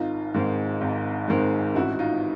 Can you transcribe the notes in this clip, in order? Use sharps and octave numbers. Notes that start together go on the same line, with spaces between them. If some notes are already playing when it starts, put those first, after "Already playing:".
Already playing: G#1 D#4 F4
G#2 D#3 G#3 C4
G#1
G#2 D#3 G#3 C4
A1 E4 F#4
F#4
D#4 F4